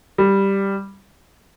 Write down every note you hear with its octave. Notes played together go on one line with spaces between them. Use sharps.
G3